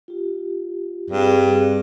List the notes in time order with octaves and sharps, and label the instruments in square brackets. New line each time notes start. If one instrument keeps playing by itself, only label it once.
[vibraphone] F4 G4
[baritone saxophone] G2 [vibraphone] G3 C4 G#4